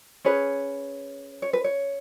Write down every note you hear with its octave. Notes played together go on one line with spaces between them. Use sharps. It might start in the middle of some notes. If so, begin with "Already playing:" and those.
C#4 G#4 B4 C#5
C#5
B4
C#5